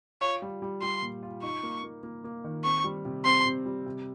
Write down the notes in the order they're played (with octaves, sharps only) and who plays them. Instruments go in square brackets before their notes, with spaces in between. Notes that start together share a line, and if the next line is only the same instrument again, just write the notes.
[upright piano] F4 [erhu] C#5
[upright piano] G3
G3
[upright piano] G3 [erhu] C6
[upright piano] A#2
F4
[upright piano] D#4 [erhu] C#6
[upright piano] A#3
A#3
A#3
A#3
D#3
[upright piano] C4 [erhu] C#6
[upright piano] G3
C3
[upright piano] C4 [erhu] C6
[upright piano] C3
G3
C3